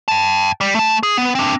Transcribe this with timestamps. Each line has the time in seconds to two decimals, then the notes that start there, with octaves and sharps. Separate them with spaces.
0.08 G5 A5
0.61 G3
0.75 A3 A5
1.03 G#4
1.18 B3
1.35 C4 D4